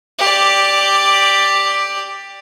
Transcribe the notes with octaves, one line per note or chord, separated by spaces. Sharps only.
G4 D5